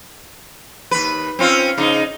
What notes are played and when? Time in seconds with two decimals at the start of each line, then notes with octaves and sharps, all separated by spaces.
0.91 D#2 B4
1.39 C4 C#4 F4
1.78 C#3 D#4